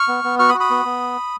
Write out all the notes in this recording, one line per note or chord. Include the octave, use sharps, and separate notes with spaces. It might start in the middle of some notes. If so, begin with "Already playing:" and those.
Already playing: C#6 F6
B3
B3
F#4 C#6 F6
B5 D#6
F#4
B5 D#6
B3
B3